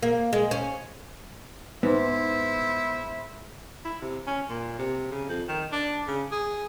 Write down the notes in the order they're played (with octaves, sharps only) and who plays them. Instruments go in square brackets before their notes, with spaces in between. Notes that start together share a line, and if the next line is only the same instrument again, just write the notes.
[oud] A#3
G#3
C#4
[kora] G#2 [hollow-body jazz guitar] B3 [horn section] E4 C5 E5
[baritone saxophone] E4
C3
C#4
A#2
C3
C#3
F2
D#3
D4
C#3
G#4